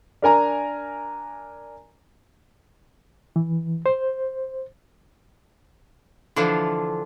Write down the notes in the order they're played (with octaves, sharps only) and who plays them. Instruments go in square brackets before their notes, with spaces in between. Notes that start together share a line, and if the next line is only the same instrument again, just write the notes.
[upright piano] D4 A#4 G#5 A#5
[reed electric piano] E3
C5
[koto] D3 E3 F3 D4 E4 F4